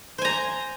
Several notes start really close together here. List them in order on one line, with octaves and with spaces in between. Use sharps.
C5 G#5 A#5